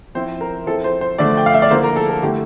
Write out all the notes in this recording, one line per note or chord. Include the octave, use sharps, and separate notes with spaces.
F3 C4 E4 C5
A#4
F3 C4 E4 A4
C5
C5
D3 F3 A3 D4 D5
G5
F5
E5
D5
D3 F3 A#3 E4 C5
A#4
A4
A4
D3 A3 E4 G4